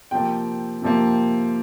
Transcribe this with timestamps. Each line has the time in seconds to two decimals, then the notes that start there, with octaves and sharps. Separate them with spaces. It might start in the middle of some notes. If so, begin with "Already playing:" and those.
0.11 C3 F3 A#3 G5
0.82 C3 F3 A#3